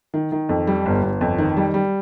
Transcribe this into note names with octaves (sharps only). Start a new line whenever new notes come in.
D#3
D#3
F2
G3
G1
G1
F2
D#3
G3
G3